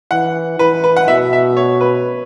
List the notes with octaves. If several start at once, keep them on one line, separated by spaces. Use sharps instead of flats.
E3 F#5
E3 B4
B4
F#5
B2 E5
E5
C#5
B4